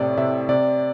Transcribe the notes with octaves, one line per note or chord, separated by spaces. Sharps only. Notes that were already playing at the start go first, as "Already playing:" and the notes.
Already playing: A2 C3 D5
C3 E5
C3 D5